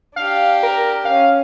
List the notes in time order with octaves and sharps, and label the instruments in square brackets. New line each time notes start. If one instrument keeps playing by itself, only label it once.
[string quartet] D4 G4 [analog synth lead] F5
[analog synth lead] A#4
[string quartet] C#4 [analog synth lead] F5